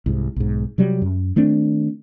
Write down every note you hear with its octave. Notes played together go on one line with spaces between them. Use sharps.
C2 G#2
B1 G#2
C3 F#3 G3
F#2
D#3 A3 C4 D4